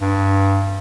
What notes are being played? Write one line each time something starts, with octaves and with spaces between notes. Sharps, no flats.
G2